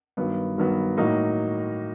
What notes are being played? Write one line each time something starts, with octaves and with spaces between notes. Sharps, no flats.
G2 D#3 F#3 B3
G2 D#3 F#3 B3
A2 F#3 A#3 D#4